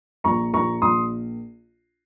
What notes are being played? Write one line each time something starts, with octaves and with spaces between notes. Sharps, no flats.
A#1 A#5 C#6
A#1 A#5 C#6
A#1 C6 D#6